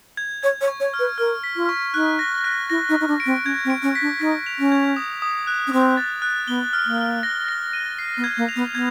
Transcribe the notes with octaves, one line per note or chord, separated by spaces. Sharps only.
G#6
C#5 G#6
C#5
C#6
C#5
F6
B4
A#4 F6
B6
F4
C#6
D#4 F#6
A#6
F#6
E4 A#6
D#4
A#6
D#4
D4
D7
C4
C#4 G#6
C4
D7
C#4
B6
D4
D#4 B6
F7
C#4
G#6
D#6
D#6
F#6
C#4
C4 D#6
A6
F#6
B3 G7
F6
A#3
F6
A#6
A#6
D#7
C7
B3
G#6
A#3
F7
B3
B3 G#6